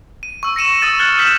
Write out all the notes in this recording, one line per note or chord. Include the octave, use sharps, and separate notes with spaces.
D#7
C#6 E6
A#6 C#7 D#7 E7
D#6 E6 A6
F6 F#6 G#6 A6 C#7 G7
F6 G6 B6 E7 F#7